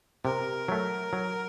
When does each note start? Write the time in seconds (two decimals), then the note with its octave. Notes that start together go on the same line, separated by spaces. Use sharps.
0.24 C3 A#4
0.68 F#3 A3
1.13 F#3